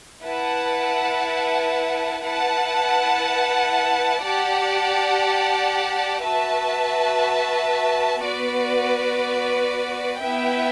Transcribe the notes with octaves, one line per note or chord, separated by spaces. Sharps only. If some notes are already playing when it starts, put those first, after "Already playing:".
E4 B4 F#5 A5
E4 B4 F#5 A5
G4 D5 F#5 A5
F#4 B4 E5 A5
B3 F#4 B4 D5
B3 E4 B4 E5 G5